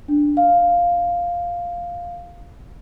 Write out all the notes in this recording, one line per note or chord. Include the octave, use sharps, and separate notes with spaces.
D4
F5